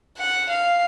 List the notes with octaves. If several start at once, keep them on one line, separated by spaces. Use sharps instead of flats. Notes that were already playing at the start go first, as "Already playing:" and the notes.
F#5
F5